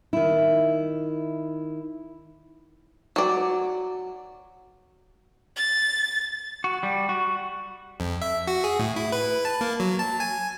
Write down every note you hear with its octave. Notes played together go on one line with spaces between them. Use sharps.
D#3 E4
F#3 D5
A6
F#4
G3
F#4
F2
E5
F#4
G#4
A2
E4
B4
A5
A#3
F#3
A5
G#5